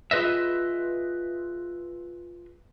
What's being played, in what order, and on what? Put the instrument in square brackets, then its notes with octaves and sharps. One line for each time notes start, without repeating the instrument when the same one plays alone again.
[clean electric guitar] F4 G#4 B4 D#5 E5